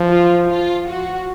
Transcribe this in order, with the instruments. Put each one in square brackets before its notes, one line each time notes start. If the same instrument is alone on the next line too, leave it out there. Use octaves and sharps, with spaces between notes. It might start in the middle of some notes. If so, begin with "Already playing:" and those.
Already playing: [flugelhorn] F3
[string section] F4
F4
F#4